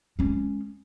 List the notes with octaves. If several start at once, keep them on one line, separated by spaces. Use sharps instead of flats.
G#3 C#4